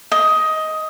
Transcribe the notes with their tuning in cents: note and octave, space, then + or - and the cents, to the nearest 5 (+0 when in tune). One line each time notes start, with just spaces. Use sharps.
D#5 +15